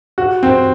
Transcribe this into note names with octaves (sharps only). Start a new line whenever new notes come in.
F#4
C4